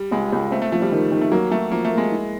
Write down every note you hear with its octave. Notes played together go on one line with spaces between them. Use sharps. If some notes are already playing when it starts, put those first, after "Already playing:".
Already playing: G3
C#2 G#3
C#2
A3 C4
A3
F3 A3
G3
D#3
D#3
A3
F#3 A#3
F#3 A3
F3 A#3
A3
A#3
G#3
E4